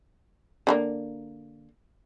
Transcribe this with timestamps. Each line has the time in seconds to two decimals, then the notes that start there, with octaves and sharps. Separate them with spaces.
0.67 D3 A3 A#3